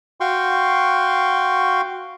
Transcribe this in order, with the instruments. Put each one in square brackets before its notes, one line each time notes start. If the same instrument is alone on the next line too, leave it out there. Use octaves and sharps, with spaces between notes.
[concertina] F#4 F5 G5 C6 C#6